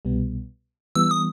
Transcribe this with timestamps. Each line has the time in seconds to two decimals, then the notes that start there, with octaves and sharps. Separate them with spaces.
0.05 C2 B2 G3 B3
0.95 E3 G3 B3 E6
1.11 D#6